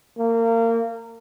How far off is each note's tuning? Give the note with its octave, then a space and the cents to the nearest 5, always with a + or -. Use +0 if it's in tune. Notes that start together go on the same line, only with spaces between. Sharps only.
A#3 -25